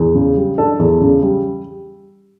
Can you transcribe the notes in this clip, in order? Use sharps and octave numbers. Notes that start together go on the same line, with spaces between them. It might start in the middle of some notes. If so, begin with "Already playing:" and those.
Already playing: E2
C#3
G3
D4 A4
E2
C#3
G3